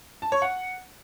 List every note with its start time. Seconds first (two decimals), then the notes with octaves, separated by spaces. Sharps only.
0.22 A5
0.32 C#5
0.42 F#5